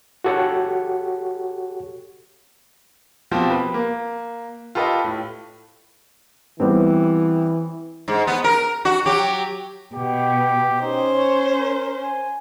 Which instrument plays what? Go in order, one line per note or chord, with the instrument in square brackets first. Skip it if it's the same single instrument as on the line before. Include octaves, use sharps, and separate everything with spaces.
[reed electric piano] F#4 G4 A4 C#5 F#5 C#6
[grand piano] B2 F3 C4 F4 G4
B4
A#3
F4 G4 A4 B4 D#5
A2
[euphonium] E3 [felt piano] G3 B3 C4
[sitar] G#2
B3
A#4
F#4
F#3 G4
[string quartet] B2 [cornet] G4
[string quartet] C#4 C5 [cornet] D#4
[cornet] C#5
A#4
G#5